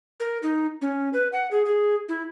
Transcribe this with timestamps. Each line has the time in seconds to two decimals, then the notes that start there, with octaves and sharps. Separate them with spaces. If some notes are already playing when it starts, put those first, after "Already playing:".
0.20 A#4
0.43 D#4
0.82 C#4
1.13 B4
1.33 F#5
1.51 G#4
1.65 G#4
2.09 E4